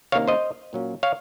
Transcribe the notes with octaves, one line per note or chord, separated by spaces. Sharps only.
C3 D#3 A#3 C#4 C#5 F5
C5 D#5
A#2 F#3 A#3 C#4
C#5 F5